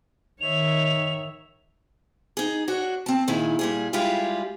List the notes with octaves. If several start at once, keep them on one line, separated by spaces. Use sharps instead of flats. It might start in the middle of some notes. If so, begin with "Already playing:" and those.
D#3 C#5 E5 F7
D#4 G#4
D4 F#4 C#5
C4 A5
A#2 D#3 E4 G#4
A#2 G3 G#4
G3 G#3 E4 F4 G4 G#4